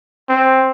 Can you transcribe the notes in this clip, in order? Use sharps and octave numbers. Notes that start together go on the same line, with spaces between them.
C4